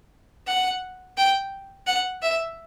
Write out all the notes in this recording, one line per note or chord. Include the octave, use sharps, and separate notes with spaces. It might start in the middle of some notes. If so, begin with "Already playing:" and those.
F#5
G5
F#5
E5